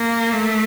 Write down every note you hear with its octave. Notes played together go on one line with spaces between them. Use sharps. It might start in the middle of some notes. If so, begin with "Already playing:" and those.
Already playing: A#3
A3